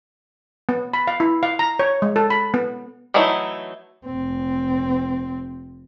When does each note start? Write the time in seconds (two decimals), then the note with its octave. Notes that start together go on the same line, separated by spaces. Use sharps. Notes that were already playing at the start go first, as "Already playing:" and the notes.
0.69 B3
0.94 B5
1.07 F5
1.20 E4
1.43 F5
1.59 A#5
1.79 C#5
2.02 G#3
2.16 A4
2.30 B5
2.54 B3
3.14 E3 F#3 A3 D#4 E4
4.06 F1 C4